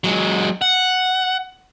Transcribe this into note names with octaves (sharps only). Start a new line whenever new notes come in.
F#3 G#3
F#5